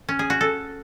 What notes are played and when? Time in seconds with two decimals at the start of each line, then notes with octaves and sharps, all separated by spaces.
0.09 C#4
0.19 G#4
0.30 F#4
0.41 A4